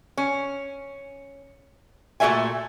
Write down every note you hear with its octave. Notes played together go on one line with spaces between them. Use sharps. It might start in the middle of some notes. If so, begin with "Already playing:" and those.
C#4
A#2 A3 F#4 D#5 E5 G#5